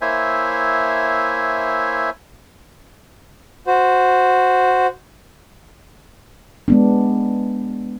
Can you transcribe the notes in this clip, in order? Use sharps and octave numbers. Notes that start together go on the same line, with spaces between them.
A#3 E4 C5 C#5 E5 G#5
F#4 C5
G#3 B3 D4